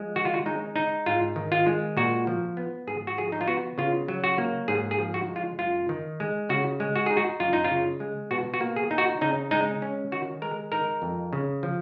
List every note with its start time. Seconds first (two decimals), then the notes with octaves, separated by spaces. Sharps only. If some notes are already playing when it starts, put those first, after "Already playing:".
Already playing: F3 G#3
0.15 D#3 F#4
0.25 F4
0.34 F#4
0.46 G#3 D#4
0.76 D#4
1.06 G#2 F4
1.36 D#3
1.52 F4
1.67 G#3
1.97 A#2 F#4
2.27 F3
2.57 B3
2.87 G#2 G#4
3.07 F#4
3.18 F3 G#4
3.32 D#4
3.41 F4
3.47 B3 F#4
3.78 C#3 F4
4.08 F#3
4.24 F#4
4.38 A#3
4.68 G#2 G#4
4.91 G#4
4.99 F3
5.14 F#4
5.28 G#3
5.36 F4
5.59 F#2 F4
5.89 D#3
6.20 G#3
6.49 C#3 F#4
6.80 G#3
6.96 F#4
7.06 D#4 G#4
7.17 F#4
7.40 F#2 F4
7.53 D#4
7.64 F4
7.71 C#3
8.00 G#3
8.31 B2 F#4
8.54 F#4
8.60 A#3
8.76 G#4
8.91 D#4
8.98 F#4
9.21 C#3 D#4
9.51 G#3 D#4
9.82 C#4
10.12 D#3 F#4
10.42 G#3 A#4
10.72 D#4 A#4
11.02 F2
11.33 C#3
11.63 F3